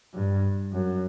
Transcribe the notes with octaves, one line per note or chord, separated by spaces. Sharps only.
G2
F#2